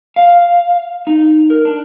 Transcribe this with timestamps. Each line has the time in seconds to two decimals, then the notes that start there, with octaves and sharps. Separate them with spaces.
0.16 F5
1.07 D#4
1.50 A#4
1.65 D4